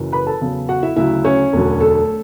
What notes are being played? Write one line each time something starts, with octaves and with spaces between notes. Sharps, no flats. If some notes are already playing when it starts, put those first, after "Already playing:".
Already playing: F#1 F#2 E3
B4 B5
A4 A5
E2 C#3 F#3
F#4 F#5
E4 E5
D2 C#3 F#3 E4 E5
C#4 C#5
E1 D2 D3 F#3
A3 A4